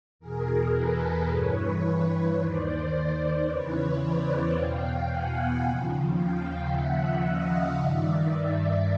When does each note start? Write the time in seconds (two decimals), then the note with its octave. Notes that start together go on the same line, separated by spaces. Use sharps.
0.19 E2 B2 G#4 A#4
0.74 A4 B4
1.28 G2 E3 B4 C#5
2.36 D#2 D#3 C5 D5
2.90 C5 D5
3.44 E2 C#3 E3 B4 C#5
3.98 C5 D5
4.52 E2 B2 F5 G5
5.06 F#5 G#5
5.61 D#2 C#3 F3
6.14 F5 G5
6.69 D#2 C#3 F3 E5 F#5
7.23 D#5 F5
7.76 G2 D#3 D5 E5